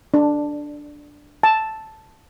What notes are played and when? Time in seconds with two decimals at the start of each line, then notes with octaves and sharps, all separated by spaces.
0.14 D4
1.43 A5